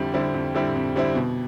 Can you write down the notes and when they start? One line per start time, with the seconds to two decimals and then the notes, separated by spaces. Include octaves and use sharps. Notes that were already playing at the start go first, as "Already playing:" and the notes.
Already playing: F2 D3 G3 C4 E4
0.14 D3 G3 C4 E4
0.34 F2
0.54 D3 G3 C4 E4
0.75 F2
0.95 D3 G3 C4 E4
1.15 B2